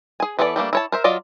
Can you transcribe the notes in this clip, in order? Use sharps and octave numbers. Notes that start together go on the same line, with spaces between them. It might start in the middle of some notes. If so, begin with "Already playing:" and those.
G#4 G#5
E3 B3 A4 C#5 D5
G3 A3 A#3 D4
E4 C#5 A5
A#4 C5 E5
F#3 F4 D5 D#5